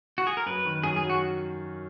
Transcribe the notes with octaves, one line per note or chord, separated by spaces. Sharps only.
F#4
G#4
A#4
F#2 B4
D#3
F#2 G#4
G#4
F#3
F#4